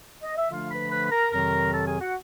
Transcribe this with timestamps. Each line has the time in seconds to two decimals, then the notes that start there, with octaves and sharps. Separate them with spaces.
0.22 D#5
0.36 E5
0.50 D3 F3 A3 D4 F4 F5
0.70 B4 B5
0.90 B4 B5
1.05 B5
1.11 A#4 A#5
1.32 F2 C3 D#3 F#3 A#4 A#5
1.73 A4 A5
1.87 G#4 G#5
2.00 F#4 F#5